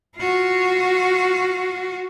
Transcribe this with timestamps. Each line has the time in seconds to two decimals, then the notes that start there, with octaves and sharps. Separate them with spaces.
0.16 F4 F#4